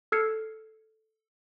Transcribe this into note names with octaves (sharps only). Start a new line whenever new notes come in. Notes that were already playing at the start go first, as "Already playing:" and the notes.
A4 E6 F6 G#6 C7 C#7